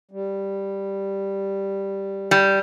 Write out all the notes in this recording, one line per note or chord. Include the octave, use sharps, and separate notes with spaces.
G3
G3